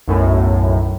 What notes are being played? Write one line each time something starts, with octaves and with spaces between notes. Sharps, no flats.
B1 F#2 A2